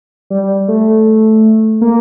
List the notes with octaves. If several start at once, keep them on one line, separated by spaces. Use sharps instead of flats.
G3
G3
A3
A#3